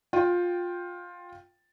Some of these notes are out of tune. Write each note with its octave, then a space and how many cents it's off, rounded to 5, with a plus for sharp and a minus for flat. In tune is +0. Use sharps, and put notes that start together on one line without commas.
F4 +15 G5 +0